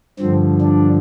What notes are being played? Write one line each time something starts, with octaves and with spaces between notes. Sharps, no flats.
G2 D3 F3 C4
D4